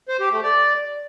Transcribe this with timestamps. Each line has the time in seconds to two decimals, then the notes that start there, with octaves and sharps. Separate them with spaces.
0.09 C5
0.20 G4
0.31 A3
0.43 D5